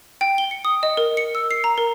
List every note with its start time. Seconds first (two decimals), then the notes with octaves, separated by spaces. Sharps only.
0.21 G5
0.38 G7
0.51 C#7
0.65 D#6
0.83 D#5
0.97 A#4
1.17 C#7
1.35 E6
1.51 C7
1.64 A#5
1.78 A#4